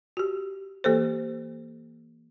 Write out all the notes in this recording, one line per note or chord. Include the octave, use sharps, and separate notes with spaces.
F#4 G4
E3 A#3 G4 A4 C5